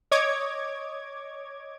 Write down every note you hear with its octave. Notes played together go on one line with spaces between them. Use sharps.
C#5 D#5 D6 G#6